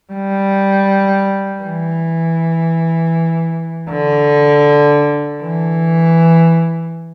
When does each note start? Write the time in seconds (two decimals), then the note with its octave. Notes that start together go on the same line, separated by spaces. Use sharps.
0.13 G3
1.63 E3
3.90 D3
5.42 E3